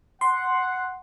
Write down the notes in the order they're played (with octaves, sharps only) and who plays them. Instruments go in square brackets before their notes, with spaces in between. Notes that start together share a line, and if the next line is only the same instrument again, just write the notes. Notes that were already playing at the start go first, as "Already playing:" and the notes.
[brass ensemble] F#5 [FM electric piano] C6